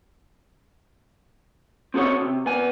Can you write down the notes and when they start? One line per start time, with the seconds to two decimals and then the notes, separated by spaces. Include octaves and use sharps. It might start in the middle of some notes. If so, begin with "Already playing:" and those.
1.94 C4 F#4 A4 B4 C#5
2.22 C3
2.46 B3 G#5